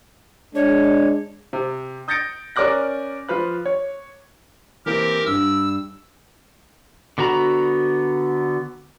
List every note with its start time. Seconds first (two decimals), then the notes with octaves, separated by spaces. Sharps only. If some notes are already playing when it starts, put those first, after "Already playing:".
0.55 G#3 D4 C#5
1.53 C3
2.08 D#6 G6 A6 A#6 C#7 D7
2.56 C#4 A#4 D5 D6 F#6 A#6
3.29 F3 F4 B4 F#6
3.66 C#5
4.86 E3 A#3 C4 G4 A#4
5.26 G2 G3 E6
7.18 D3 B3 F#4 A#5 B5